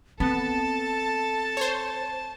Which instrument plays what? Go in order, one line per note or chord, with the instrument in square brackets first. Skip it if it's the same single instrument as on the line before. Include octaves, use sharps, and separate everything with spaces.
[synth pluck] B3 [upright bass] C4 [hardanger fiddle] A4 [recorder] A5
[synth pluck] C5 C#5